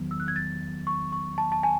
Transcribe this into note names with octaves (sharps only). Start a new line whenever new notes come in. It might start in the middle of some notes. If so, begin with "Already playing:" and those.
Already playing: E2 D#3 F#3 B3
E6
F#6
G#6
A6
C#6
C#6
A5
A5
G#5